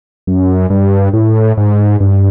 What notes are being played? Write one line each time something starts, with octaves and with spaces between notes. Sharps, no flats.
F#2
G2
A2
G#2
G2